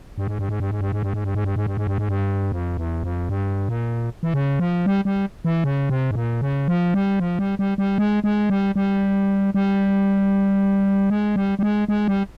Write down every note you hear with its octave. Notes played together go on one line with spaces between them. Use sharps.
G2
G#2
G2
G#2
G2
G#2
G2
G#2
G2
G#2
G2
G#2
G2
G#2
G2
G#2
G2
G#2
G2
F2
E2
F2
G2
A#2
E3
C#3
F3
G3
G3
E3
C#3
C3
G#2
A#2
C#3
F3
G3
F3
G3
G3
G3
G#3
G#3
G3
G3
G3
G#3
G3
G3
G#3
G#3
G3